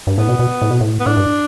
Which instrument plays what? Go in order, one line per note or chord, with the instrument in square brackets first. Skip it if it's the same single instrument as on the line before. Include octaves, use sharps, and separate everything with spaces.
[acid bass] G2
[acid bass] A2 [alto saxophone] B3
[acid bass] B2
B2
A2
B2
A2
[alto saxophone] B3
[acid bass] A2 [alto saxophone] D4
[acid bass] G2